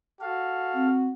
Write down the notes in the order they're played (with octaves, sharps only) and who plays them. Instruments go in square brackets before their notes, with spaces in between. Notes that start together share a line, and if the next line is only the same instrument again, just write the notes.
[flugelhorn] F#4 [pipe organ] A4 F5
[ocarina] C4